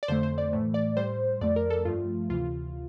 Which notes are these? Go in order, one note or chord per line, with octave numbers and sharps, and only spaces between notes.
D5
F2 D3 A3 C5
C5
D5
A2 E3 A3
D5
A2 G3 C5
F2 D3 F3 A3 D5
A#4
A4
G2 F3 A3 F4
D2 C3 E3 F4